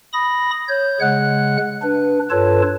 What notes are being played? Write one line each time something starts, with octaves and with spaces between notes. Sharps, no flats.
B5 D#6 A#6
C#5 G6
C#3 G#3 F#5 F#6
D4 B4
G2 F4 A4 B4 C#5 A5